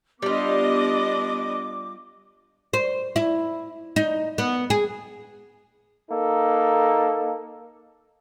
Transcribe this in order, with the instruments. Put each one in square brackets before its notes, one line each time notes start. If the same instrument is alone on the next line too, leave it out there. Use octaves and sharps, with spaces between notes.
[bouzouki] G3 F4 [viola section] B3 D4 D#5 [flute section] D6
[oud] C5
E4
D#4
B3
G#4
[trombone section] A#3 D#4 A4